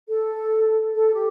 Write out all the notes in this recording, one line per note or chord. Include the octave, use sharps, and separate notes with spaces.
A4
A4
G4